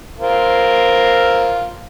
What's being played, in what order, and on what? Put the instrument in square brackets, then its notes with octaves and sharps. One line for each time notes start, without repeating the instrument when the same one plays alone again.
[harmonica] C4 F4 A#4